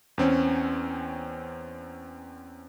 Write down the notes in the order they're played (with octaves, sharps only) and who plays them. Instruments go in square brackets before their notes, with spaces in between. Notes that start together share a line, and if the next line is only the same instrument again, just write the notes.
[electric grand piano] E2 C4 C#4